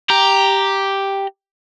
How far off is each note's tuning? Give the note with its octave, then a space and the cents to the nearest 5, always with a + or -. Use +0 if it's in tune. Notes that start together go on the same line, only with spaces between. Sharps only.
G4 +0 A#5 +0